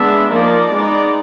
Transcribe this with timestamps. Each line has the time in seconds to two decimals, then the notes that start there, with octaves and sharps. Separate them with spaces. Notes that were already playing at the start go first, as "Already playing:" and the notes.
Already playing: G#3 B3 D4 E5
0.29 F3 A#3 D#4 D5
0.71 G#3 B3 D#4